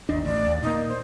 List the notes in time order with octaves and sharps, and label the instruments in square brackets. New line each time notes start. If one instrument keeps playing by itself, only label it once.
[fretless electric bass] G1 D#2 D4 [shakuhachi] D#5
[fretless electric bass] A1 D2 [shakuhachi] D5
[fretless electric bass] D#2
[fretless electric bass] A#2 A#3 [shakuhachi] D#4
[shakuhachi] C5